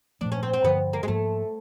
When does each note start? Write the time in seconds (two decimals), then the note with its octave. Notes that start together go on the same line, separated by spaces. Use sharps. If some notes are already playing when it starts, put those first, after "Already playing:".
0.21 A#2 F3 A3 D4
0.32 C#4
0.43 C4
0.53 C4
0.64 G2 D3 F3 B3
0.93 A#3
1.03 G#3
1.07 G#2 F3 A3 A#3